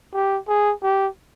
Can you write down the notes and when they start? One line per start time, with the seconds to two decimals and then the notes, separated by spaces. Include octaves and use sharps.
0.14 G4
0.48 G#4
0.83 G4